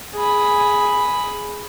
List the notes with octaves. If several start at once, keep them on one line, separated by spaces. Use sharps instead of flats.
G#4 B5